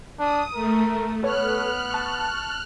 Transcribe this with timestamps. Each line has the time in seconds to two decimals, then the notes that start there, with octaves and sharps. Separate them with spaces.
0.19 D4 D#6
0.55 A3 A#4
1.23 B3 A4 B4 C#5 F6 F#6
1.90 A5 C#6